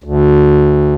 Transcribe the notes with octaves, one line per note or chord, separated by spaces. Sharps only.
D2